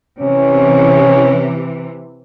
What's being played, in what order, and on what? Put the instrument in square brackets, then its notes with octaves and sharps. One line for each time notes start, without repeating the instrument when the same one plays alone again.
[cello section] C3 E3 [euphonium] C#4